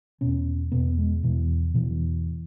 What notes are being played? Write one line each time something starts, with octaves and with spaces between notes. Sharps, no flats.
E2 B2 C#4
E2 B2 B3
G#3
E2 B2 E3
E2 B2 E3